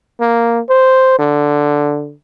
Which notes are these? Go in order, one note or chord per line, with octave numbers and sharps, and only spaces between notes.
A#3
C5
D3